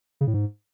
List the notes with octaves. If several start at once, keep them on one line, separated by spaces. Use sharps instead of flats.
C#3
A2
G#2